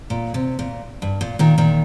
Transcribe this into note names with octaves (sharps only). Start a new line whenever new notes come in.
A#2
C3
A#2
G2
A#2
A#2 D#3
A#2 D#3